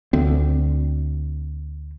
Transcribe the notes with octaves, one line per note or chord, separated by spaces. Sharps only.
D2 C4